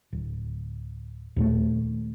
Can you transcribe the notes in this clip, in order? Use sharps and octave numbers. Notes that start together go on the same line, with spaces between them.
D1
D#2 A#2 A3